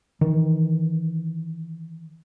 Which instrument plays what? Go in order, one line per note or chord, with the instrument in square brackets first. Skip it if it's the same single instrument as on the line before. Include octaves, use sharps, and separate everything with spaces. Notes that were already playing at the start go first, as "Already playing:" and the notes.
[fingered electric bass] D#3 E3